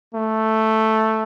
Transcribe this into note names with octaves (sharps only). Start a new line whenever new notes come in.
A3